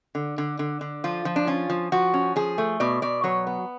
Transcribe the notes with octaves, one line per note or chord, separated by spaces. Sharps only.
D3
D3
D3
D3
F3 F4
F3
D4
C#4 F4
F3
F3 F#4
C#4
F3 G#4
A3
B2 D5
B2 D5
F#3 C#5
B3